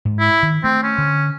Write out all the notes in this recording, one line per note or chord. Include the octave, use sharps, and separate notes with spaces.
G#2
E4
D#3
A3 C4
C#4
D3